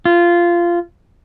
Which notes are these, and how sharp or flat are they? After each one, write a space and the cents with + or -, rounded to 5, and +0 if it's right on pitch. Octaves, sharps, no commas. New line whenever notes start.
F4 -15